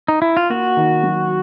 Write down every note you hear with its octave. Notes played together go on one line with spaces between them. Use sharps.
D#4
E4
F4
A#3 F#4
D#3
F#3